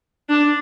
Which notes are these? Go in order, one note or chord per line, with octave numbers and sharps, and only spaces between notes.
D4